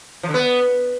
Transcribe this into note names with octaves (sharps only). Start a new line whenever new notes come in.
F3
D3
B3